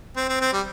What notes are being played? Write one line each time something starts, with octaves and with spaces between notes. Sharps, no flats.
C4
C4
C4
G3